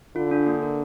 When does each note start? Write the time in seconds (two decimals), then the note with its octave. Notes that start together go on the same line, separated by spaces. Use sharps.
0.16 D3 F4
0.31 D4
0.47 A#3
0.62 A#4